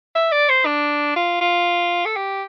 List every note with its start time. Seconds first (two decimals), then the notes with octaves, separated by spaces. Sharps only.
0.15 E5
0.32 D5
0.49 C5
0.66 D4
1.16 F4
1.41 F4
2.05 A4
2.16 G4